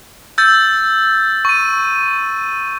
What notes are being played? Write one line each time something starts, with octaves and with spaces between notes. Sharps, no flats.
E6 G6 A6
C#6 D#7